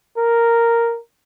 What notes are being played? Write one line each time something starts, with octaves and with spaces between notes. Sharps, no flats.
A#4